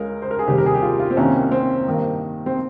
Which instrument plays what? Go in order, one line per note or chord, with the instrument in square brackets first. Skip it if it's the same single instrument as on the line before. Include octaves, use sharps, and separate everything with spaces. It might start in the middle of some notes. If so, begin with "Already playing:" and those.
Already playing: [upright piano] C#2 C#3 G#3 A#4
C5
A#4
G#4
F1 D#2 D#3 G3 G4
A#4
G#4
G4
F4
F4
C4
C2 C3 D#3 A#3 C#4
C4
G2 D#3 A#3
C4